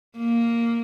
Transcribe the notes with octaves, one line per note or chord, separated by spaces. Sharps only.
A#3